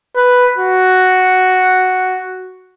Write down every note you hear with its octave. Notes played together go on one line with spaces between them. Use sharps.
B4
F#4